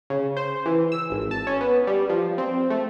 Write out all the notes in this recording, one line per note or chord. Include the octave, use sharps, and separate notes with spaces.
C#3
C5
E3
E6
G#1
A5
C#4
B3
G3
F3
C4
A3